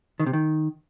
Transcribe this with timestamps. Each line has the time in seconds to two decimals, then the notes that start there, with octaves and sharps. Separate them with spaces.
0.20 D#3
0.26 C3
0.33 D#3